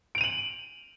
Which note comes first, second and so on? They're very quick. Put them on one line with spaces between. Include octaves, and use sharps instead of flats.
D7 F7 D#7 F#7